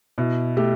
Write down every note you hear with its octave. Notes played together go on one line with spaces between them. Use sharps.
B2 E4
A3 G4